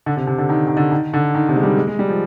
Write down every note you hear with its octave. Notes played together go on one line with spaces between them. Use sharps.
D3
C3
C3
D3
D#3
D#3
D3
D#3
D3
D#3
C3
G#3
G3
G#3
G#3
G3
F3